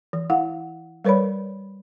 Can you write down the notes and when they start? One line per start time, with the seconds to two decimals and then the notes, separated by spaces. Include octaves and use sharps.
0.13 E3
0.30 E4 F5 F#5
1.05 G3 A#4 B4 C#5 D5 B5